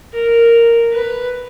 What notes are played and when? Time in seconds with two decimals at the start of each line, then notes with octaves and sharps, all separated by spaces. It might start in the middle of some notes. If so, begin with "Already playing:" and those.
0.13 A#4
0.93 B4